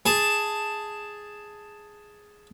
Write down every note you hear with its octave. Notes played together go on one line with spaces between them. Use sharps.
G#4 A5